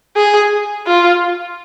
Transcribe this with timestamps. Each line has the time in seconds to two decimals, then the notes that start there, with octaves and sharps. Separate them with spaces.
0.16 G#4
0.87 F4